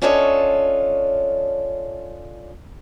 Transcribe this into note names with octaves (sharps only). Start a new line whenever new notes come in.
C#4 D4 F4 A4 C#5 D#5